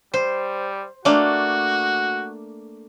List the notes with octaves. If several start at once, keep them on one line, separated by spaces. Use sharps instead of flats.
G3 C5
A3 A#3 D4 F#4